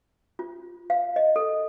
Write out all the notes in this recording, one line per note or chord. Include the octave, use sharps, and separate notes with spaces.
F4
F5
D#5
A4